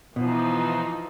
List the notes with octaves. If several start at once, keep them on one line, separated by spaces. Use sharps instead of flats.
B2 E3 F3 D#4